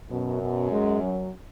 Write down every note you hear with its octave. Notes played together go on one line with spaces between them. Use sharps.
F#2 B2
B2
G#3
F#3